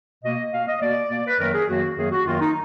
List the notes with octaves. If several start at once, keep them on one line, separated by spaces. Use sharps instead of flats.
B2 A#3 D#5
B2 A#3 F5
D#5
B2 A#3 D5
B2 A#3
B4
F#2 D#3 F#3 A#3 A#4
G#4
F#2 D#3 F#3 A#3 F#4
F#2 D#3 F#3 A#3 G#4
F#4
F#2 D#3 F#3 A#3 F4
D#4